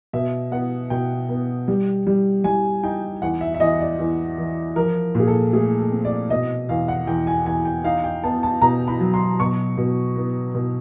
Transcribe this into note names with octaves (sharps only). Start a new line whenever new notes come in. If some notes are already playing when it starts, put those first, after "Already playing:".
B2 E5
B3 F#5
B2 G5
B3
G3
G3
G3 G#5
D#4 G5
E2 F#5
E5
E5
E2 D#5
D5
E2
E3
F3 A#4
A#2 G#4
A4
A3 G#4
A4
C4
D5
B2 D#5
E2 F5
F#5
E2 G5
G#5
E2 G#5
G5
D#4 F5
G5
B3 A5
A5
B2 A#5
B5
F#3
C6
B2 C#6
B2
B3
B2